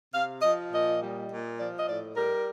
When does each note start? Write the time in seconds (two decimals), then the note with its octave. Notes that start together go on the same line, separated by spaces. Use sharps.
0.13 C3 F5
0.42 F3 D#5
0.72 A#2 D#5
1.00 G3
1.29 A#2
1.59 F3 D5
1.79 D#5
1.87 A2 D5
2.16 G3 A#4